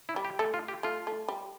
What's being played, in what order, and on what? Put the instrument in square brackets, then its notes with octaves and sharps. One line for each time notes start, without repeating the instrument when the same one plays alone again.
[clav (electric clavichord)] E4
[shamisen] G3
[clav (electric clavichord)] G4
[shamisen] A3 [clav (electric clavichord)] A4
[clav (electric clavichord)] F4
G4
[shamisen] A3 [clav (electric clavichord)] F4
[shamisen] A3
G3